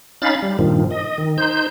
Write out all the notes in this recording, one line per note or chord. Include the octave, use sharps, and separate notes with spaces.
C#4 D#4 F5 B5 A6
G3
G2 A#2 D#3 F3
D#5
D#3
D#4 C5 G6